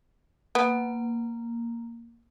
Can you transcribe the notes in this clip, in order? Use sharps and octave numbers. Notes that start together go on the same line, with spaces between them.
A#3 B3